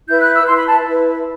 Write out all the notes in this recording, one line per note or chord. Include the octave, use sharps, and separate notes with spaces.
E4 B4 G6
F#6
E6
E4 B4 C6
B5
A5
E4 B4